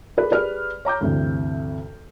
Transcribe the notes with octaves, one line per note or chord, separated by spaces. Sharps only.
G#4 A4 B4 D5
G4 G#4 B4 D5 F6
C#5 A#5 D6 G6
D2 G2 C3 E3